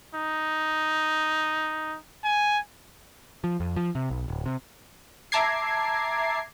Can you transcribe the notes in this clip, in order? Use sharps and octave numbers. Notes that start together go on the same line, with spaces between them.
D#4
G#5
F3
F2
F3
C3
B1
D1
C3
E5 A5 A#5 D6 G#6 C7